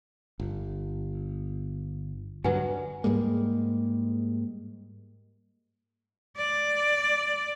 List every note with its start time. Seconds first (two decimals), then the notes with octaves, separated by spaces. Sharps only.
0.40 G1
2.44 G2 D3 F#3 B4 F#5 G#5
3.04 G#2 G3 G#3 A#3
6.37 D5